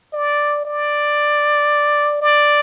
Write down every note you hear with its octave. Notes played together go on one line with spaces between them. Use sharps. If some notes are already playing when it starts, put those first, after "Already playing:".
D5
D5
D5